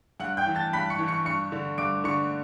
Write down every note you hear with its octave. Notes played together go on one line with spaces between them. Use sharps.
G2 F#5 F#6
G5 G6
E3
A5 A6
G2 B5 B6
C#6 C#7
E3
C#6 C#7
G2 C#6 C#7
D3
G2 D6 D7
D3 C#6 C#7